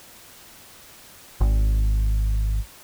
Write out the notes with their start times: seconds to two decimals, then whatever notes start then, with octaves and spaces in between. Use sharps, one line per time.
1.41 G#1